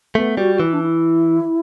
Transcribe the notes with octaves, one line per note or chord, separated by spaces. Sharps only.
A3 B3
G3 F#4
F#4
E3 E4
D4
E4